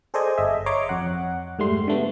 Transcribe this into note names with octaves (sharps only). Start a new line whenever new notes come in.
G#4 A4 C5 D5 D#5 G#5
G1 D#5 E5
C#5 D#5 A#5 C6 D6
F2 F#5
G#2 G3 A3 C6
D3 A3 B3